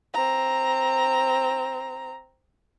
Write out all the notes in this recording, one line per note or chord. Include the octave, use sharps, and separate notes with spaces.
C4 A#5